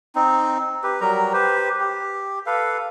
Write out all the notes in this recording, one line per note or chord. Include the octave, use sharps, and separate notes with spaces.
C4 D#4
G4 B4
F#3 G3 A#4 A#5
G4 B4 C5
G4
A4 B4 F5